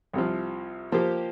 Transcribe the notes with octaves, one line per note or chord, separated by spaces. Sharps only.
C2 C3 F3
F3 A#3 G4 C5